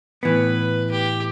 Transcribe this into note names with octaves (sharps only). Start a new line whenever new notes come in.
A2 E3 B3 B4
G4